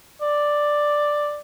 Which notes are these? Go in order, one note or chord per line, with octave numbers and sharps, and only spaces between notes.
D5